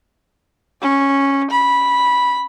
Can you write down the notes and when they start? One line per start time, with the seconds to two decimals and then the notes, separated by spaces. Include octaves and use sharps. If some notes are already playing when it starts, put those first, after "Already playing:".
0.82 C#4
1.51 B5